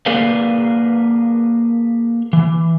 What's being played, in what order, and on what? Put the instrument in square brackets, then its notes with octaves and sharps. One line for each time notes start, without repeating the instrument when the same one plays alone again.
[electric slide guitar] A#3 G#4 A#4 B4 D5 F5
E3